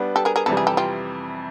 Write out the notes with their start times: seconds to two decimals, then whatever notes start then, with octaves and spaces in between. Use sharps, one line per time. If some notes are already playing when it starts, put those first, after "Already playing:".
Already playing: G3 B3 D4
0.16 G4 A4
0.25 G#4 A#4
0.36 G#4 A#4
0.46 F2 C3 E3 G3 A4
0.57 G#4
0.67 G4 A4
0.77 F4 G4